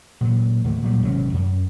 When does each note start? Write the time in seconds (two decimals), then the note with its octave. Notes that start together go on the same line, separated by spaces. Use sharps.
0.21 A#2 E3 F#3
0.64 D#2 A2 D3 A3
0.82 A#2 F#3 G3
1.02 G#1 C3 F#3 C#4
1.34 F#2